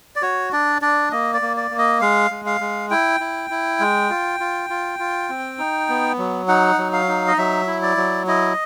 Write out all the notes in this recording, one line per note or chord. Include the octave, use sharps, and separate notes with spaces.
D5
F#4 C#5
D4 D5
D4 D5
A#3 D#5
D5
A#3
D5
A#3
D#5
G#3 F5
G#3
F5
G#3
E4 G5
E4
E4
G#3
F4
F4
F4
F4
C4
D#4
B3
F#3
D#4 F#5
F#3
F5
D#4
D#5
F#3 E5
E4
D5
F#3
E4 D#5